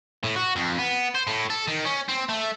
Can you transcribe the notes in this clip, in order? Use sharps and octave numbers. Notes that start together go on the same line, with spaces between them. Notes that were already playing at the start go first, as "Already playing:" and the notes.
A2
F#4
F2
B3
C5
A2
A4
D#3
C#4
C4
A3